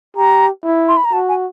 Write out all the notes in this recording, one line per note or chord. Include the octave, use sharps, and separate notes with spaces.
G4 A#5
E4
C6
B5
A#5
F#4 A5
G#5